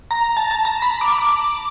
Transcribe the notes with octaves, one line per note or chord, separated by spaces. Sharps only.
A#5
A5
A5
A#5
B5
D6
D6